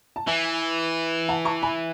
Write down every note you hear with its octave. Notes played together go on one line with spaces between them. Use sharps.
A5
E3 E5 G#5
F#5 A5
A5 C#6
G#5 B5